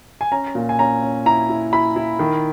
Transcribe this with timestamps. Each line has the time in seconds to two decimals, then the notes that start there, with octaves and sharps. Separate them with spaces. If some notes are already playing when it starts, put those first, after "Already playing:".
0.21 G#5
0.32 C#4 A#5
0.55 A#2
0.69 G#5
0.79 C#4 A#5
1.03 C#4
1.26 E4 A#5
1.49 E4
1.73 E4 B5
1.96 E4
2.19 D#3